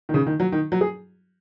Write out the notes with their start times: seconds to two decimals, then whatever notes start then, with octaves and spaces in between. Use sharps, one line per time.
0.09 D#3
0.14 C#3
0.27 D#3
0.40 F#3
0.52 D#3
0.72 F#3
0.81 G#4